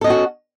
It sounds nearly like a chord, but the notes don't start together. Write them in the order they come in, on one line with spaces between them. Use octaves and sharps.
A4 D#5 C#4 F#4